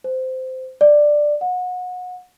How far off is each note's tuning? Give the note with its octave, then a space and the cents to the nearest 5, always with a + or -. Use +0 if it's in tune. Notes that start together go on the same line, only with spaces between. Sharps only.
C5 -15
D5 +10
F#5 -30